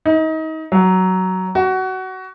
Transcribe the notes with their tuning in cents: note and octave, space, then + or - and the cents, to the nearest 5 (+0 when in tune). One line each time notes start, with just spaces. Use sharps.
D#4 +30
F#3 +10
F#4 +20